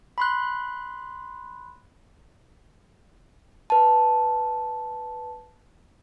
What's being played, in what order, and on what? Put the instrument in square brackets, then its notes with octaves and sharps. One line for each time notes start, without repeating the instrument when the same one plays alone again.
[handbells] B5 C6 F#6
[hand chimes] B4 A5